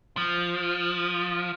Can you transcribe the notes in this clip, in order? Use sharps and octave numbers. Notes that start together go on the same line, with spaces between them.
F3